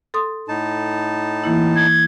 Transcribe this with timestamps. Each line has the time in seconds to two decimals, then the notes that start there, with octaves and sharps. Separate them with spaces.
0.14 A4 C6 D#6
0.48 A2 D#4 A5
1.44 E3 A#3 E4
1.76 G#6